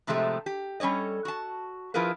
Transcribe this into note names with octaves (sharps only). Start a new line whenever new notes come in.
A2 C3 F3 G#3 A3 G4
G4
G3 C#4 A4 C#5 D#5
F#4 A5
F3 E4 F4 G#4 A#4 B4